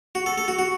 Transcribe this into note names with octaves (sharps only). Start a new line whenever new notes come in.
F#4
A4
A4
F#4
F#4